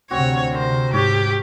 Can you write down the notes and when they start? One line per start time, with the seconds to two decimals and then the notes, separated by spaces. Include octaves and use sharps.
0.11 D2 C3 C4 F#4 C#5
0.54 A#4 C5
0.93 G#2 G4 C#5